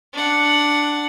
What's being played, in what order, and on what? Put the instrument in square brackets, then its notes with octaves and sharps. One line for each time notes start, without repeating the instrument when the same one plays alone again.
[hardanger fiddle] D4 F#5